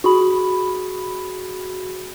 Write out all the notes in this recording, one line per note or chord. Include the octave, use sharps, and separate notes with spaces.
F#4 G#4 B5